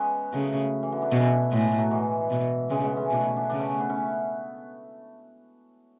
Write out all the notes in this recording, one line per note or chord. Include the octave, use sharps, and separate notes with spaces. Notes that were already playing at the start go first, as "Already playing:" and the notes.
Already playing: G#3 B3 C#4
C#3 F#3 A3
E3
D3 F#3
B3 D4
B2 C#4 E4
B3 D4
A2 G#3 B3
F#3 A3
F#3 A3
E3 G#3
B2
C#3 E3 G#3
G#3 B3
A3 C#4
B2 D4
C#4 E4
B3 D4
C#3 B3 D4
A3 C#4
B3 D4
C#4 E4